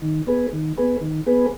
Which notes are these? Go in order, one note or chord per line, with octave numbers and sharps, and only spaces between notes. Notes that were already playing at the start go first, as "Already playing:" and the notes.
D#3
B3 G#4 B4
D#3
B3 G#4 B4
D#3
B3 G#4 B4